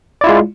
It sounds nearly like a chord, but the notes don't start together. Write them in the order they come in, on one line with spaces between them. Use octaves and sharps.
D5 E4 F4 G#3